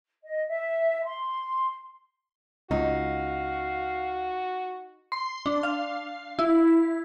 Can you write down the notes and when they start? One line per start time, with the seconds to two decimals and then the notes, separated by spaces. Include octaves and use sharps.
0.23 D#5
0.47 E5
1.04 C6
2.71 C#2 D#4 F#4 F5
5.12 C6
5.46 D4
5.63 F5
6.39 E4